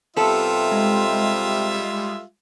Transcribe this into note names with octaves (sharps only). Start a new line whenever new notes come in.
C3 G3 B3 F4 A4 E5
G#3